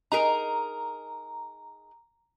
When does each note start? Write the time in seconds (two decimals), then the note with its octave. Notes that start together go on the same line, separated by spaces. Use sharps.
0.12 D#4 G#4 A#4 A#5